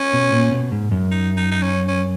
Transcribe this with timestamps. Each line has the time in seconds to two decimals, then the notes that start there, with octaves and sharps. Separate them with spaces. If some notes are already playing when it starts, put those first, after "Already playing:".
Already playing: C#4
0.13 B2
0.32 A#2
0.52 B2
0.72 G#2
0.91 F#2
1.11 D#4
1.37 D#4
1.51 D#4
1.62 C#4
1.88 C#4